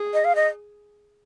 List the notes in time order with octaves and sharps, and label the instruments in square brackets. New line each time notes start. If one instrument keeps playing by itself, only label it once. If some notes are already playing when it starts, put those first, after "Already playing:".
Already playing: [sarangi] G#4
[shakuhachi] D#5
F5
D#5